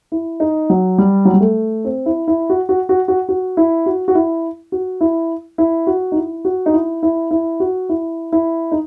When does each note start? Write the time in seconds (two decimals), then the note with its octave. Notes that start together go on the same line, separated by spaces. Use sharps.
0.12 E4
0.40 D#4
0.70 F#3
0.98 G3
1.25 F#3
1.34 G3
1.41 A3
1.85 C4
2.06 E4
2.28 E4
2.50 F#4
2.69 F#4
2.89 F#4
3.08 F#4
3.29 F#4
3.57 E4
3.86 F#4
4.08 F#4
4.15 E4
4.72 F#4
5.01 E4
5.58 E4
5.87 F#4
6.12 D#4
6.16 E4
6.45 F#4
6.66 D#4
6.74 E4
7.03 E4
7.31 E4
7.60 F#4
7.89 E4
8.32 E4
8.72 D#4